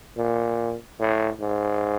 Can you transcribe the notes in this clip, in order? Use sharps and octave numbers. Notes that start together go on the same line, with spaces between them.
A#2
A2
G#2